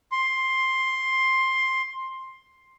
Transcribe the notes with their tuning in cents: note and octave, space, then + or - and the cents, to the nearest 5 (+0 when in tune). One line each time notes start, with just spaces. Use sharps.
C6 +10